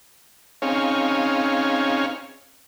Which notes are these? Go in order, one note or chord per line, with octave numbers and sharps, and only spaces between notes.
C4 C#4 D#4 G#4 C#5 F5